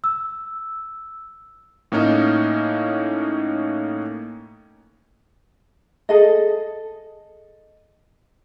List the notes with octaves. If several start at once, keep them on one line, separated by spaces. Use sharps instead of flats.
E6
A2 A#3 C#4 D#4
G#4 A4 D#5